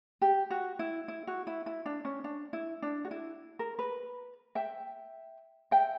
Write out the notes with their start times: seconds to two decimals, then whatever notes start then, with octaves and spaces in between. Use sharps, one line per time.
0.21 G4
0.50 F#4
0.79 E4
1.08 E4
1.27 F#4
1.47 E4
1.66 E4
1.86 D4
2.05 C#4
2.24 D4
2.53 E4
2.82 D4
3.05 F#4
3.11 E4
3.59 A#4
3.79 B4
4.55 E5 G5
5.71 E5 G5